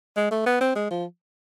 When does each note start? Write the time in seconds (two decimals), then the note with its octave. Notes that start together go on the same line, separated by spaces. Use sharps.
0.16 G#3
0.31 A3
0.46 B3
0.61 C4
0.76 G#3
0.91 F3